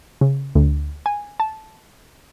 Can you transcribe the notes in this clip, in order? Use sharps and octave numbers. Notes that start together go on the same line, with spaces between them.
C#3
D2
G#5
A5